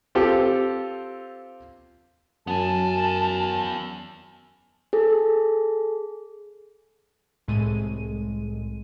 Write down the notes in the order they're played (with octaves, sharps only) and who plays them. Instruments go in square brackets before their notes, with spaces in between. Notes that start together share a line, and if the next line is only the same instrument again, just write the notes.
[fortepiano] C4 F4 G4 A4
[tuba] F#2 [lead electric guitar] B3 G#5 [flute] A5
[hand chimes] G#4 A4
[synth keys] C2 A2 G#3 D#7